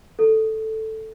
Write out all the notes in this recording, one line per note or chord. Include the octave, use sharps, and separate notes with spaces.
A4